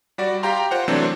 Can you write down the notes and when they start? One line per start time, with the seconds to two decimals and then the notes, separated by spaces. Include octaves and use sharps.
0.18 G3 F#4 D5
0.43 G4 F5 G5 A#5 C6
0.71 F4 C5 F#5
0.88 C3 E3 F#3 A3 C4 D4